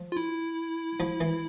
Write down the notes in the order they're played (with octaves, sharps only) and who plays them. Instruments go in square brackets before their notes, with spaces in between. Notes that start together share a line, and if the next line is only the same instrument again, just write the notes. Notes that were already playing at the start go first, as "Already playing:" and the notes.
Already playing: [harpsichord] F3
[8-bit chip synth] F4
E4
[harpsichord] F3
E3